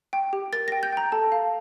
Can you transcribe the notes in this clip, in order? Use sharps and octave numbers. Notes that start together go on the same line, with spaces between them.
G5
G4
A#4 A6
A#6
G5
G6
G5 A#5
A4 A5
F5